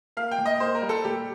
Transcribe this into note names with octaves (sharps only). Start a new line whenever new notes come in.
A#3 F5
G5
A#2
D#5
A#3 C5
A#4
G3
A4
A#2 G4